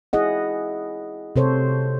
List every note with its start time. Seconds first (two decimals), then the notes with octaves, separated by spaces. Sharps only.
0.13 E4 G#4 D#5 F#5
1.36 C3 A4 C5 C#5